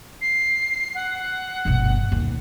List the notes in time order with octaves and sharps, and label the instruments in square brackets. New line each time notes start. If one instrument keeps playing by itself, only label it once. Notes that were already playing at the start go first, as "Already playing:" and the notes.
[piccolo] C7
F#5
[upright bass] G1 B2
D#2